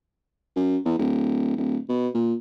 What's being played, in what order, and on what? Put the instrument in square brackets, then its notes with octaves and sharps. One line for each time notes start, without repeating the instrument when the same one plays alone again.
[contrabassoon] F#2
E2
D1
D1
B2
A#2